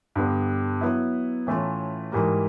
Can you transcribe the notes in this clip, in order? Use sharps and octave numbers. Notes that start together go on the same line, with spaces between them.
G2 D3 G3 B3 D4
F#3 B3 E4
A2 E3 A3 C#4 F4
G#2 E3 G3 A#3